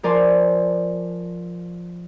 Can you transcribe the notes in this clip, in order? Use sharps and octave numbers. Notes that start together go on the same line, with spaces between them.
F3 A#4 D5 G#5 A5 C6